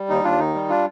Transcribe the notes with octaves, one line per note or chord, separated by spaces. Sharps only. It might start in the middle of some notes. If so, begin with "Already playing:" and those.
Already playing: G3
D#2 D#4
D#2 D4 F4
D#3 D#4
G3
D4 F4